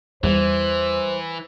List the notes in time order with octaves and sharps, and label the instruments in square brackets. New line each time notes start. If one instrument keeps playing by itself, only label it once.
[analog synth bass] E2 [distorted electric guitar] E3 [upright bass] G3 [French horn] C5